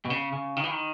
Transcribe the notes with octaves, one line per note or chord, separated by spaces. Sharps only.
B2
C#3
C#3
D#3
E3
D#3